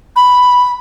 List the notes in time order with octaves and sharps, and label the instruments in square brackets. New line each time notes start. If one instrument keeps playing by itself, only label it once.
[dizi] B5